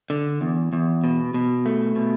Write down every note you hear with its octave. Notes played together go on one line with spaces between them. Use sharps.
D3
E2
E2
B2
B2
A3
B2